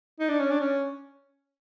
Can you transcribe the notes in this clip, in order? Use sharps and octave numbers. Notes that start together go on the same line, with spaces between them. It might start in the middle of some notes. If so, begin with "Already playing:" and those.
D#4
D4
C#4
D4
C#4